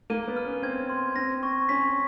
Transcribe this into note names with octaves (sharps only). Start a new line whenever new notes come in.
A#3 D#7
B3
F6
C#4
C4 G#6
C6
C4 A#6
C#6
C#4 B6